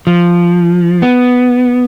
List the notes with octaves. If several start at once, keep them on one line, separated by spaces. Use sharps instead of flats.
F3
B3